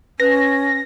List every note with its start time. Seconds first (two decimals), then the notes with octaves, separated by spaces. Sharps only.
0.20 C#4 B4 F#6 A#6